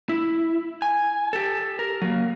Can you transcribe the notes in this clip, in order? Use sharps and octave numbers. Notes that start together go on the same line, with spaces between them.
E4
G#5
G4 A4
A#4
F#3 A#3